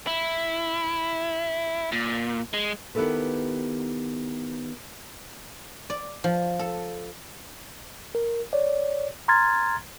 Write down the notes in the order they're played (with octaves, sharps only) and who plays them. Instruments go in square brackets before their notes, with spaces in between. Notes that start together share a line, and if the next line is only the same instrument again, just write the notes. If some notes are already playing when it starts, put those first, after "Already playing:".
[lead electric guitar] E4
A#2
G#3
[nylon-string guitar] D#3 B3 E4 G4 A4 B4
[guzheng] D5
F3
A4
[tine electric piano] A#4
C#5 D5
A#5 C6 F6 G#6 A6